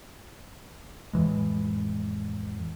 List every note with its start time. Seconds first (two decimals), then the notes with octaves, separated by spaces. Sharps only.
1.13 F2 A2 E3 G#3